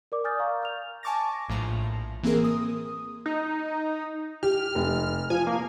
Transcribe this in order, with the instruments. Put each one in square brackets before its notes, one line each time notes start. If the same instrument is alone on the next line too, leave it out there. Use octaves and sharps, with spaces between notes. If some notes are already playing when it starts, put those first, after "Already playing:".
[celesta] A#4 D5 D6
D5 G#5 D#6 F6 G6 A6
F5 A#5 C#6
F6 G6 F7
[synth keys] G#5 A5 C#6 D6 A6 A#6
A#1 A2 F3 A#5
E3 A#3 C4 G#4 A#4
D#6
[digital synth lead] D#4
[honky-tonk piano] G4 [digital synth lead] F6
[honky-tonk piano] F1
[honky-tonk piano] F3 [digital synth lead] G#5
[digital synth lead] A#3